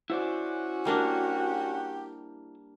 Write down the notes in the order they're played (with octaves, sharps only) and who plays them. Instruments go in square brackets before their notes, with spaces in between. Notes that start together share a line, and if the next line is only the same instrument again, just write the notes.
[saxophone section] C#4 F#4 [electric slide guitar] E4 C5 D5
[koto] G3 A#3 D4 [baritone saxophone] G4